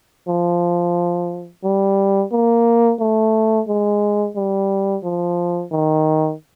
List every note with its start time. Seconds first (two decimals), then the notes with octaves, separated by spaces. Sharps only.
0.28 F3
1.64 G3
2.32 A#3
3.00 A3
3.68 G#3
4.36 G3
5.03 F3
5.72 D#3